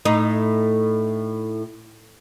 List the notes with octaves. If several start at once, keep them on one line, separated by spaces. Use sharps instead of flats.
A2 D#4